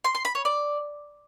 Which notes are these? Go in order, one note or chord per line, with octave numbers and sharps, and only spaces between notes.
C6
C6
B5
C#5
D5